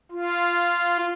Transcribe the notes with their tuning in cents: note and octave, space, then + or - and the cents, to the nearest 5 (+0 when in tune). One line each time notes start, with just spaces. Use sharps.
F4 -10